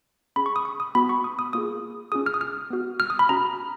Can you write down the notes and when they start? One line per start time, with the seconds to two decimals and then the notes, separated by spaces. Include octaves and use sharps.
0.36 C#4 G#4 B5
0.46 C#6
0.56 D#6
0.65 C#6
0.80 D#6
0.95 B3 F#4 B5
1.09 C#6
1.24 D#6
1.39 D#6
1.53 A#3 F4 G#4 D#6
2.12 C#4 F4 G#4 D#6
2.26 F6
2.34 D#6
2.41 F6
2.70 B3 F#4
3.00 F6
3.10 D#6
3.19 B5
3.29 C#4 F#4 A#5